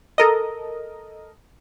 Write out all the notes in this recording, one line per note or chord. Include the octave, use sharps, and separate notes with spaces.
A4 A#4 D#5